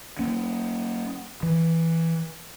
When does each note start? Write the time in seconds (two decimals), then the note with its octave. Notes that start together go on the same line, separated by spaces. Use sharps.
0.19 A#3 C#4
1.43 E3